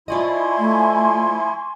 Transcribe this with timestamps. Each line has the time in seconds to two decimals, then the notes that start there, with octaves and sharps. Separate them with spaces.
0.08 F3 E4 F4 D5 D#5 G#5 C6 C#6
0.58 A3